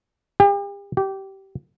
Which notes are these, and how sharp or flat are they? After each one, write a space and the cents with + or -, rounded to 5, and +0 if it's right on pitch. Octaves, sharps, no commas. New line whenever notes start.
G4 +40
G4 -20